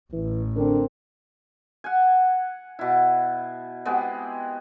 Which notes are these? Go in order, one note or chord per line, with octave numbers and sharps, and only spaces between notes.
A1 E3
D3 C4 D4 A#4
F#5 G#5
B2 E4
G#3 B3 C4 G4